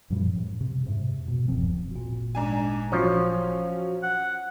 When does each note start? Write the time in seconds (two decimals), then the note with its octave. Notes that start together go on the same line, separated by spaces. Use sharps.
0.10 F#2 A#2 F3 G3
0.35 A2
0.61 C3
0.85 F2 G#2 C3
1.28 B2
1.48 D1 F#2 F3 C4
1.91 G#1 A#2
2.35 G#2 D4 G#5
2.92 F3 F#3 C#4 C#5
4.03 F#5